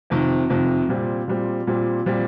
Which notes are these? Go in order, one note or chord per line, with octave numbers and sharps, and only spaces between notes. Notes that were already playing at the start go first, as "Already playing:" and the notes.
F2 C3 D#3
F2 C3 D#3
A#2 G3 C4
A#2 G3 C4
A#2 G3 C4
A#2 G3 C4